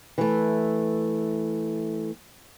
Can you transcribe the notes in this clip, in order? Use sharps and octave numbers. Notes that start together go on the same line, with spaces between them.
E3 A3